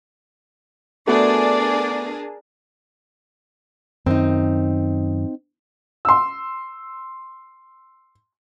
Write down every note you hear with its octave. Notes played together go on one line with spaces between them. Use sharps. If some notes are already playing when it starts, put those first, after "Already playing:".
A3 B3 D4 F#4 G#4 A#4 D5
F#2 D#3 C4 D#4
C6 E6